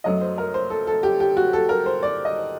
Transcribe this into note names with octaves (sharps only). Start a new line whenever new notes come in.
F#2 F#3 A3 D#5
C5
A#4
C5
A4
A4
G4
G4
F#4
A4
A#4
C5
D5
D#5